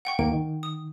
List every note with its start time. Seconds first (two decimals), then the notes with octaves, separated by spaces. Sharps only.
0.05 F#5 G5 C#6
0.19 D#2 G#2 A#3 G5
0.32 D#3
0.63 D#6